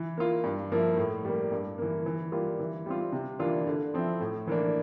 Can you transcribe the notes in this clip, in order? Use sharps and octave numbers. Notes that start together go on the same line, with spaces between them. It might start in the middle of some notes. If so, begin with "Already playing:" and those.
Already playing: E3
A#3 F4
G2
F3 A#3 E4
A2
G3 A#3
G2
E3 A#3
E3
G3 A#3 F4
E3
G3 C4 F4
C3
E3 A#3 D4 F4
D3
F3 C4 E4
A2
E3 A#3 D4